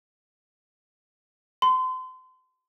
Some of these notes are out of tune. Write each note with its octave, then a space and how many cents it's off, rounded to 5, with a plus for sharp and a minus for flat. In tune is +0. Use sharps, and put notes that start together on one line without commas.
C6 -35